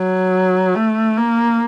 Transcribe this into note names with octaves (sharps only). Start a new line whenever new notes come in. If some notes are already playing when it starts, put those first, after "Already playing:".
Already playing: F#3
A3
A#3